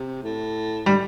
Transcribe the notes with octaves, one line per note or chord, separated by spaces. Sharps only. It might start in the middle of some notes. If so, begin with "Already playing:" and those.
Already playing: C3
A2
G3